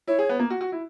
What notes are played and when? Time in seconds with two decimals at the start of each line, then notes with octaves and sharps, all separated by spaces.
0.08 E4 C#5
0.19 G#4
0.29 B3
0.39 A#3
0.50 F#4
0.61 F#4
0.72 E4